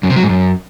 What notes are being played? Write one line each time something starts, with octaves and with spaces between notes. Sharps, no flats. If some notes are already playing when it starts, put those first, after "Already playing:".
F#2
C3
F#3
G#2
F#2